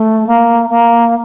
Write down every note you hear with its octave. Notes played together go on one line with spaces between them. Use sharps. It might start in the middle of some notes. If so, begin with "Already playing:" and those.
Already playing: A3
A#3
A#3